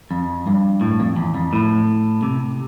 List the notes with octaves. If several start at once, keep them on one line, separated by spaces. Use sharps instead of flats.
F2
G2
A2
F2
E2
F2
A2
C3